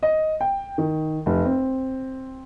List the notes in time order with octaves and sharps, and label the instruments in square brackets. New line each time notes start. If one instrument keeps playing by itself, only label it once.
[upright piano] D#5
G5
D#3
F1
C4